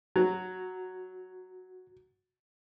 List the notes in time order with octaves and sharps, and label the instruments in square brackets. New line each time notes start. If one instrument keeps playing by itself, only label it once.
[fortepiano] F#3 [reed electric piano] F#4